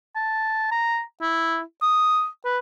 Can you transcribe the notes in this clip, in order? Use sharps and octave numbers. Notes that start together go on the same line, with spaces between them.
A5
A#5
E4
D#6
B4